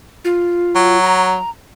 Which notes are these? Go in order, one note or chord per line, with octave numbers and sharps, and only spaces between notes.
F4
F#3
A#5